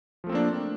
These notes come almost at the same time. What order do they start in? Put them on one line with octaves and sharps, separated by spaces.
F3 A3 C4 A#3 D4